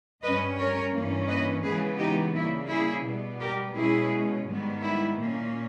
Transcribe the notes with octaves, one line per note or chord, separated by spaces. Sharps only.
G2 G3 C#4 B4 D#5
A#4 C#5
G2 E3 A#3 C#4
B4 D#5
C#3 E3 G#3 B3 G#4 B4
D#4 G4
C#3 G3 A#3 E4
E4 G#4
B2 G3 B3
G4 A#4
B2 G#3 C#4 E4 G#4
G#2 D#3 G3 B3
E4
A#2 A#3 C#4